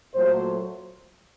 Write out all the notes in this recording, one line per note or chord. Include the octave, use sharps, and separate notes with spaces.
A#2 F#3 A3 C5